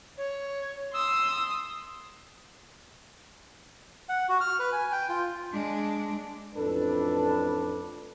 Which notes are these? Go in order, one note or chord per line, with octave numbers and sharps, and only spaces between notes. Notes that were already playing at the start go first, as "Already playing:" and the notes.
C#5
C6 D#6 E6
F#5
F#4
F6
B4
G#5
G5
F4
G#3 D4
A1 F2 D4 A4 B4